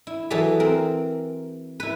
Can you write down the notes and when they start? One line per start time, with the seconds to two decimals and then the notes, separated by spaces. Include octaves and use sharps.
0.07 E4
0.30 E3 F#3 G#4 A4 E5
0.60 C4 A#4
1.80 E4 B4